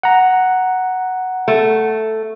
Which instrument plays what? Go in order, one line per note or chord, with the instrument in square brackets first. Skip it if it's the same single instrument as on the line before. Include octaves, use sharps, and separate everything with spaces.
[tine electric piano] F#5 A#5
[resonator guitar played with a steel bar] A3